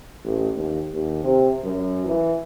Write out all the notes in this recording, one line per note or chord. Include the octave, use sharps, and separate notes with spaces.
A1
D#2
D#2
C3
F#2
E3